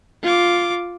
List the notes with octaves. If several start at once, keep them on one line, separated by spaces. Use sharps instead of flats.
F4 D6